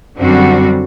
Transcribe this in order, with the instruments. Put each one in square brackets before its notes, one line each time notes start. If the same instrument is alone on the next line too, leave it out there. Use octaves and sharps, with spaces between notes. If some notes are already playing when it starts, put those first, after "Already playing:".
[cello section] F#2 D3 G3 C4 F#4